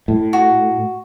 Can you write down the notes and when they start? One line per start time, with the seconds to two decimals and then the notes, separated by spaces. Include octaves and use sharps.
0.08 A2
0.33 F#4